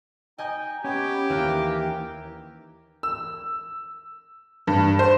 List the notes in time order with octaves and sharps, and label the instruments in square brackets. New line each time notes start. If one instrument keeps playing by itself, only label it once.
[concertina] D#4 G5 [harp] D#5 G#5 D#6
[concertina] B3 C#5 D6 [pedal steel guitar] C#4 [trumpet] G4
[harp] D#2 [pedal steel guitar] E3 A#3 F#6 [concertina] A#4
[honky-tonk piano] E6
G2
C5